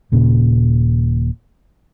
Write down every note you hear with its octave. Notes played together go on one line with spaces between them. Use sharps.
D#1 A#2 C#3